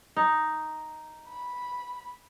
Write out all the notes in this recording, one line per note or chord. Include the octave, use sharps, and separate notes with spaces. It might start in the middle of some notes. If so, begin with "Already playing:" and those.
D#4
B5